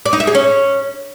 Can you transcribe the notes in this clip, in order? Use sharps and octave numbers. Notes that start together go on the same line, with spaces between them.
D5
D#4
E5
G#4
C#4